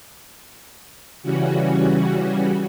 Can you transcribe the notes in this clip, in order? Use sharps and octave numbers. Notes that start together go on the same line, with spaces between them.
C#3 E3 G3 C#4 F#4